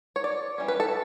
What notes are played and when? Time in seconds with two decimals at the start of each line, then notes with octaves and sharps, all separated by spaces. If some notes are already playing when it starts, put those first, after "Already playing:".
0.16 C#5
0.24 D5
0.58 E3 G3 C#4
0.68 B4
0.80 A4